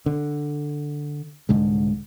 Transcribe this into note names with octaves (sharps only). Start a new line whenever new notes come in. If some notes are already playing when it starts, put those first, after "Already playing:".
D3
C2 G#2 D3 G#3